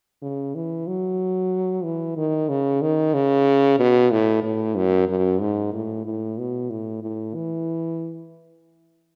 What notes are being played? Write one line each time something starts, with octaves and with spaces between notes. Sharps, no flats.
C#3
E3
F#3
E3
D#3
C#3
D#3
C#3
B2
A2
A2
F#2
F#2
G#2
A2
A2
B2
A2
A2
E3